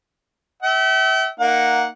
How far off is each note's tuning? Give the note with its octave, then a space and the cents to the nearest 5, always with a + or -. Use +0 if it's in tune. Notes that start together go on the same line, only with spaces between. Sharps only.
E5 -20 G5 -45
A#3 +0 D#4 +0 F#5 -10